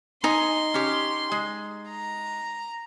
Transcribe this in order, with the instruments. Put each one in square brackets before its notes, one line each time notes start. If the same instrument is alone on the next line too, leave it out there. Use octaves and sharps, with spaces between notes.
[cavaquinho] D#4 [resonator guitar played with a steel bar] G#5 [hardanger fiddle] C6
[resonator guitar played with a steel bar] C#4 G4
G#3
[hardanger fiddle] A#5